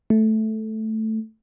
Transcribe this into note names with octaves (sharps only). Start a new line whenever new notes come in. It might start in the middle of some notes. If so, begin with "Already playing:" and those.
A3